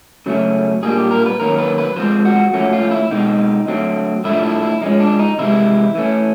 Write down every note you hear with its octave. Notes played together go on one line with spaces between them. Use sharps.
C#3 F#3 A3 C#4
A#2 G3 A#3 D4 G#4
G4
A#4
B4
D#3 F#3 A#3 C#4 A#4
B4
B4
F3 G#3 C4 C5
F#4
F3 A3 C#4 F#4
F4
E4
B2 G#3 C4 D#4
D3 F#3 A3 C4
A2 F3 A3 D4 E4
E4
E4
F3 G#3 C#4 D#4
D4
D#4
C3 E3 G#3 E4
E3 A3 C#4